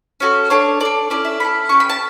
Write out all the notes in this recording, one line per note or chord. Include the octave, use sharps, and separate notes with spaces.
C#4 F#4 A4
D4 A4 C#5
D4 A4 D5
C#4 E4 A4 D5
E5
C#4 E4 A4 B5
C#4 G4 C#6
B5
A5